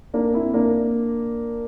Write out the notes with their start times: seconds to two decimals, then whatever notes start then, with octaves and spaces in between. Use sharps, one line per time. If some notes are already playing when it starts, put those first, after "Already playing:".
0.14 A#3 D4
0.34 C4 E4
0.54 A#3 D4